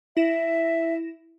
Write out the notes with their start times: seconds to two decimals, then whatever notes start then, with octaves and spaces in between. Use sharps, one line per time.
0.17 E4 E5 A#6 E7